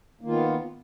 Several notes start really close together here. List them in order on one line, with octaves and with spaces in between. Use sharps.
A#3 D#3 F4 B3